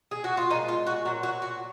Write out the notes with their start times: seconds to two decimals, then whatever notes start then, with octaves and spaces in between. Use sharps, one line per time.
0.11 G#4
0.24 F#4
0.37 F4
0.50 A#2 F3 G#3 D#4
0.68 F4
0.87 F#4
1.05 A#2 F#3 F#4
1.23 F#4
1.42 F#4